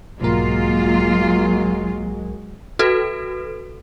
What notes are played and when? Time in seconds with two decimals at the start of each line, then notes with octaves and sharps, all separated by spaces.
0.21 B1 G#2 F#3 G#3 A#3 F4 A#4
2.79 F#4 A4 B4